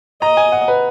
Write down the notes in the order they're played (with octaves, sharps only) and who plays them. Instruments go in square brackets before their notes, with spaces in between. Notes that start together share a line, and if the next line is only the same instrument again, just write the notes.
[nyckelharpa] D#5 [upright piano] A#5
[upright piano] G#5
F#5
B4